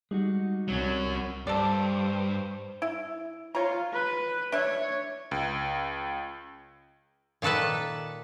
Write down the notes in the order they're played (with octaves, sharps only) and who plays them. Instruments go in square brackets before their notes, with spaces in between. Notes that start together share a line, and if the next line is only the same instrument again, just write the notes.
[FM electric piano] G3 [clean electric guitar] G#3 D#4 F#4
[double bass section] C2 [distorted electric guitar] F#3 C#4
[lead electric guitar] G2 [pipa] A4 D5 [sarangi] C5
[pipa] E4
[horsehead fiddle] F4 [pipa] C#5 A#5
[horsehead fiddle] B4
[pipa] D4 E5 [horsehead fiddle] C#5
[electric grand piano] C#2
[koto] A#2 D#3 A4 B4 A5